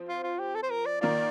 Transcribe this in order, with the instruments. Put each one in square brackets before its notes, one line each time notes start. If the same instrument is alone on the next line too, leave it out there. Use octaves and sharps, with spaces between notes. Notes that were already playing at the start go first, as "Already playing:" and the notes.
Already playing: [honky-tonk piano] F3 C4
[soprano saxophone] F4
F4
G4
A4
C5
A#4
D5
[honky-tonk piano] D#3 A#3 F4 [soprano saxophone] D5